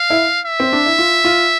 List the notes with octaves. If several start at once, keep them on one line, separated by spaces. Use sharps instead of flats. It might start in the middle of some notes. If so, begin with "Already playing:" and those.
Already playing: F5
E4
E5
C4
D4
E4
F4
F4